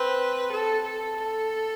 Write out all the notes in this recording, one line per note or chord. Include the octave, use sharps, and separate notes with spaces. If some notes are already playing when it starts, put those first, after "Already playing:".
Already playing: C4 B4
A4
A4
A4